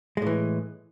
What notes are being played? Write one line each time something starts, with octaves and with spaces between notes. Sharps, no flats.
A2 E3 G#3